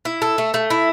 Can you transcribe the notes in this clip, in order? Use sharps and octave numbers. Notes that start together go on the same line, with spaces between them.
E4
A4
A3
A3
E4